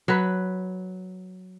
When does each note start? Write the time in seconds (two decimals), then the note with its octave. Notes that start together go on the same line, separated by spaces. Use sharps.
0.08 F#3 B4